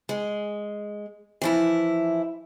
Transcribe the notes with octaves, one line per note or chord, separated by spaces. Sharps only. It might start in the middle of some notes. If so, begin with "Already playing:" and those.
G#3
E3 F3 E4